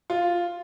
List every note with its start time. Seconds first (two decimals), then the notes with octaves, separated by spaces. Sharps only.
0.10 F4